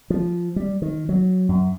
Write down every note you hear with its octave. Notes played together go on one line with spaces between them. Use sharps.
F3
G3
D#3
F#3
F#2